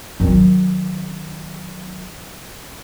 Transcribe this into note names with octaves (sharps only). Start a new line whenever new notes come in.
D#3 F#3